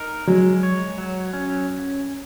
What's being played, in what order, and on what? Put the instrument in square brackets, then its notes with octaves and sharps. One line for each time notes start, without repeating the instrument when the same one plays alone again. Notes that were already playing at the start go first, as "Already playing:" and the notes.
Already playing: [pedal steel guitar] D#4 A#4
[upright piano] F#3 [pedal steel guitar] G#3
[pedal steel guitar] C#5
F#3
C#4